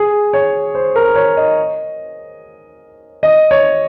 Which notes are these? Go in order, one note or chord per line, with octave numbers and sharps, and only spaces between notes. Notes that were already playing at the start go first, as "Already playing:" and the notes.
Already playing: G#4
C#5
C5
A#4
C#5
D#5
D#5
C#5